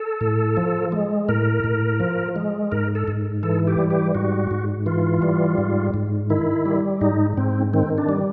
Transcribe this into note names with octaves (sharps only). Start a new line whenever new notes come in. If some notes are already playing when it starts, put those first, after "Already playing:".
Already playing: A4
A2
F3
G#3
A2 A#4
A2
F3
G#3
G#2 A#4
A4
G#2
E3 A4
G4
G3
G4
G#2 F#4
G#2
E3 F4
G3
G#2
G#2
D#3 E4
G3
G#2 D#4
G#2 C4
D#3 C4
D4
G3